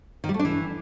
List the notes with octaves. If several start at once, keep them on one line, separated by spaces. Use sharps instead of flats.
D#3
G3
A3
D4
E3